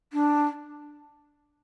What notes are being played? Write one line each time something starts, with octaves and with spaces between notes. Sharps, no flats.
D4